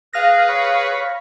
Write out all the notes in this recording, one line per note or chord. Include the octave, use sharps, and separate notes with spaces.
G#4 B4 F5 F6 A#6
C#5 B5